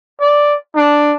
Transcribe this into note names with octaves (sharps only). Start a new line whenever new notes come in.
D5
D4